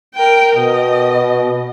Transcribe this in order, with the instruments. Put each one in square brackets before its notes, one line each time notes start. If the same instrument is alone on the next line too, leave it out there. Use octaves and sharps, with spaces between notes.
[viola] A#4 G5
[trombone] B2 [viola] D#5